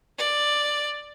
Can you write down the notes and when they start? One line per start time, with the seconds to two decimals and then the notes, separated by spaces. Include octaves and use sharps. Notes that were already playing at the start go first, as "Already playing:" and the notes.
0.18 D5